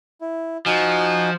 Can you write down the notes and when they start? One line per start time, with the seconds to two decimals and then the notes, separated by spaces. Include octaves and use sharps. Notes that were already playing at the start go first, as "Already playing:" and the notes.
0.21 E4
0.66 F3 D#4 F#4 G#5